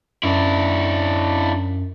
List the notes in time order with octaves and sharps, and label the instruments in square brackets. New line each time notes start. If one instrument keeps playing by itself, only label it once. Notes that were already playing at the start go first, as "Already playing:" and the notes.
[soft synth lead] F#2 [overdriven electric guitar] D4 E4